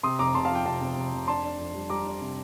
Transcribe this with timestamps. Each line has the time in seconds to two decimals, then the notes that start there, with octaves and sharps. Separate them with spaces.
0.03 C3 C6 D#6
0.19 F1 A#5 D6
0.34 F1 A5 C6
0.45 F5 A5
0.50 F3 G5
0.65 C3 F5 A5
0.81 C3
0.96 F1
1.12 F1
1.27 D4 A5 C6
1.43 D4
1.59 F2
1.74 G3
1.90 G3 A#5 D6
2.06 D4
2.21 C3